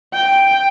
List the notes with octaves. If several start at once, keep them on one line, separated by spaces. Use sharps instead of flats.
G5